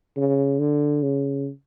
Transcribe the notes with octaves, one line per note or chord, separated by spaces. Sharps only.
C#3
D3
C#3